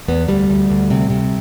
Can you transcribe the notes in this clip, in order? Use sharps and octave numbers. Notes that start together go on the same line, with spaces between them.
E2 B3
D2 G3
D2
D2
C3
C3